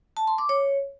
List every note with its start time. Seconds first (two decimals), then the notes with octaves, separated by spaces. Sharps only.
0.17 A5
0.27 C6
0.38 D6
0.49 C#5